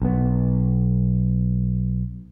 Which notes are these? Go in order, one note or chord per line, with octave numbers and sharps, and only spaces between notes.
B1 B3